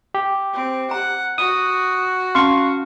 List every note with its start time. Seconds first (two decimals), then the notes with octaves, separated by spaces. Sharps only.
0.14 G4
0.54 C4
0.91 F#5 A#5
1.38 F#4 D#6
2.35 C#4 F5 A5 C6 C#6